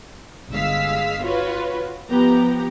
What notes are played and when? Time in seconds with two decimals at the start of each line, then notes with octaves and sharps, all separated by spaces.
0.51 G1 G#3 F5 E6 B6
1.22 F4 F#4 B4 C#5
2.10 F3 B3 G4 A#5